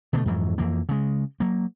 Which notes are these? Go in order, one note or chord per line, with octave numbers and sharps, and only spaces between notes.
B2 D3 G#3 A3
F2 G#2 E3 F#3
F2 E3 A#3
C#3 G#3
F#3 A#3